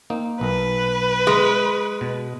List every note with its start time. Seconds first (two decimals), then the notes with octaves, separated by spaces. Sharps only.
0.10 A#3 C4 D#4
0.41 B1 A#4 B4
1.27 G#3
2.01 B2